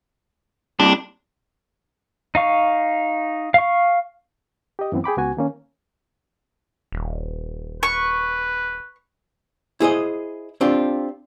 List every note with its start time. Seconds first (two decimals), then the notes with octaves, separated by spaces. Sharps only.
0.80 G2 C3 D4
2.35 D#4 F5 C#6
3.54 F5 C#6
4.79 G4 D#5
4.92 F#2 E3 B3 C4
5.04 G#4 G5 B5 D6
5.17 C#2 B3 F#4 G#5
5.37 D#3 A#3 C#4
6.92 D#1
7.83 B4 C#6
9.80 E4 G#4 C5 D#5
10.61 C4 D4 F4 G4